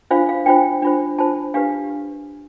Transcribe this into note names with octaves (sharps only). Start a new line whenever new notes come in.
D4 F4 C5 F5
F5
D4 F4 C5 G5
D4 F4 C5
D4 F4 C5 A5
D4 G4 B4 F5